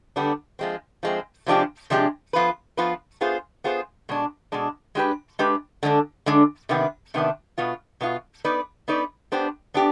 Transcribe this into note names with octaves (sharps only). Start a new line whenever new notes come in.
D3 G3 B3 D4
F3 G#3 C4
F3 G#3 C4
C3 F3 G#3 D4 G4
C3 F3 G#3 D4 G4
F3 B3 F4 B4
F3 B3 F4 B4
B3 F4 G#4 C5
B3 F4 G#4 C5
B2 G#3 D4
B2 G#3 D4
G#3 D4 G4 B4
G#3 D4 G4 B4
D3 G#3 D4
D3 G#3 D4
C3 D#3 B3 D4
C3 D#3 B3 D4
B2 B3 F4
B2 B3 F4
B3 D#4 B4 D5
B3 D#4 B4 D5
B3 D4 G4 C5
B3 D4 G4